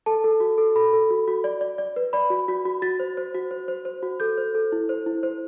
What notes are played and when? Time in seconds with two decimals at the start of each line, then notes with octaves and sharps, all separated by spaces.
0.06 A4 A5
0.24 A4
0.40 F#4
0.58 A4
0.75 A4 B5
0.93 A4
1.10 F#4
1.27 F#4
1.44 D5
1.61 D5
1.78 D5
1.96 B4
2.13 D5 B5
2.30 F#4
2.48 F#4
2.65 F#4
2.82 F#4 A6
3.00 C5
3.17 C5
3.34 F#4
3.51 C5
3.68 C5
3.85 C5
4.03 F#4
4.20 A4 G6
4.38 C5
4.55 A4
4.72 E4
4.89 C5
5.06 E4
5.23 C5